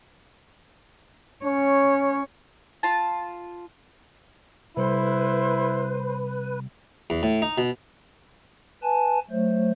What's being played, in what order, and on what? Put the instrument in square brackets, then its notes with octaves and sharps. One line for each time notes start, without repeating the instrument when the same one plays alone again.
[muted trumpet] C#4 [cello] C#5
[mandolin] F4 A5
[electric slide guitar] C3 G3 A4 [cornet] E4 [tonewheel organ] B4 [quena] C5
[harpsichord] E2
A2
D#4
B2
[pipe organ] B4 G#5 A5
F#3 A3 C5